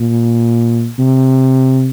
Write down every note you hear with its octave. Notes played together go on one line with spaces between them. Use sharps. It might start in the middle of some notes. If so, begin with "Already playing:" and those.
Already playing: A#2
C3